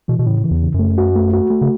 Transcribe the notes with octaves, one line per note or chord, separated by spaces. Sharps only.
B2 E3
B2
A2 C#3
E3
E2
C#3
F#2
A3
F#4
A3
F#4
A3
C#3